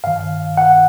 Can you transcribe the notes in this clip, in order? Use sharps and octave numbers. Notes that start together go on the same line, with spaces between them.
G2 D#3 F5
F#5